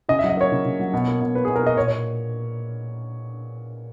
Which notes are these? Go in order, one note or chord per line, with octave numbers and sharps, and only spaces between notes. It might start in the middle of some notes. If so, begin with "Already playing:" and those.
C#3 D#5
E5
F#3
D#5
A#3 C#5
C#3
C#3
F#3
B2
A#3
B2
A#3 B4
G#4
B2
A#4
A#3 D#5
A#2 C#5
C#5